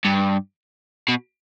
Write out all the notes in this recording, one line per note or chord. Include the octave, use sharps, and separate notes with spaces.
G2
B2